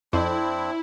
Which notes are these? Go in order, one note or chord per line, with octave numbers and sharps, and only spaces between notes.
F2 C4 D4 E4